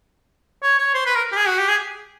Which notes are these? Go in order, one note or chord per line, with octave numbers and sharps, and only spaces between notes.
C#5
C#5
C5
B4
A#4
G4
G#4
F#4
G4
G#4